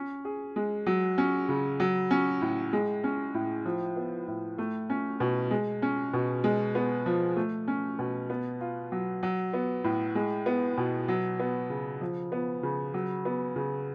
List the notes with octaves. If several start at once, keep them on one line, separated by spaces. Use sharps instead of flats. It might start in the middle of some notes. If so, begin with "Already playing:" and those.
Already playing: C#4
G#4
G#3
F#3
C#4
C#3
F#3
C#4
A2
G#3
C#4
A2
F3
B3
A2
A3
C#4
B2
G#3
C#4
B2
G#3
B3
F3
A3
C#4
B2
B3
F4
F#3
F#3
B3
A2
G#3
B3
B2
F#3
B3
C#3
F3
B3
C#3
F#3
B3
C#3